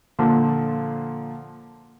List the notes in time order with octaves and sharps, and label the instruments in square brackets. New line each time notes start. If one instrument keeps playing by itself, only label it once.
[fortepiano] A#2 D3 F3 [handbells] A#3 A5